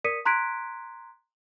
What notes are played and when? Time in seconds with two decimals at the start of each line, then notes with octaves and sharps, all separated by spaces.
0.04 A#4 D5 D#6 B6 C#7 D#7
0.25 A#5 C6 F#6 G#6 B6 D7